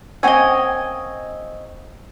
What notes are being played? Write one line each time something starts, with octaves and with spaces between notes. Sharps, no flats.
A#3 C4 C#4 C#5 D#5 F#5 G#5 E6